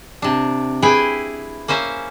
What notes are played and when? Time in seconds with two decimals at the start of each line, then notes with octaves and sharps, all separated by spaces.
0.22 C3 D4
0.82 E4 G#4 B4 G5 G#5
1.68 A#3 C#4 C5 E5